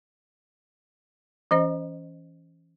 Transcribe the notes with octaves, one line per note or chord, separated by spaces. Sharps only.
E3 C#4 C5 D#5